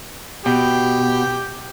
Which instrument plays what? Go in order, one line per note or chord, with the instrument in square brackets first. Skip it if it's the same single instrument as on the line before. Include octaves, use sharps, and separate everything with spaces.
[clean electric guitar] B2 [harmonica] G4